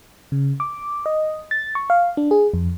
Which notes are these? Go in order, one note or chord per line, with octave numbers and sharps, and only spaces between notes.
C#3
D6
D#5
A6
C#6
F5
D4
G#4
F2